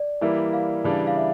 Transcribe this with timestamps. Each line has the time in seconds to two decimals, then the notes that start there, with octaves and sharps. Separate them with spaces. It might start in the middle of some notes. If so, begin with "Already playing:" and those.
Already playing: D5
0.21 E3 G3 A#3 E4
0.53 F5
0.84 C#3 E3 G3 D4
1.07 F5
1.16 E5